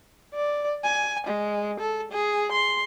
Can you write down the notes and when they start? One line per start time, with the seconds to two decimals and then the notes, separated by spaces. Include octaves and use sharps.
0.34 D5
0.84 G#5
1.27 G#3
1.80 A4
2.12 G#4
2.52 C6